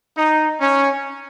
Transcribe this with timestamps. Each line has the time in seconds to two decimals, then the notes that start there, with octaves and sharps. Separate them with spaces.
0.17 D#4
0.60 C#4